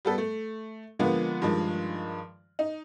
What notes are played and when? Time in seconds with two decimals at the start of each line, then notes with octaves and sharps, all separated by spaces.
0.05 G3 B3 A4
0.18 A3
0.99 D3 F3 G#3 A#3 B3
1.42 G2 D#3 F3 G#3
2.59 D#4